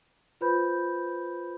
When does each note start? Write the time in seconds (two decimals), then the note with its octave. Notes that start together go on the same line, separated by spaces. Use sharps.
0.41 F4 B4 C5 B5 G6